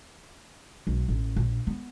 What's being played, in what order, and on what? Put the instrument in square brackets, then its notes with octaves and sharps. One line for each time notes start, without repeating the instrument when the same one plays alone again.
[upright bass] B1
A1
A#1
B3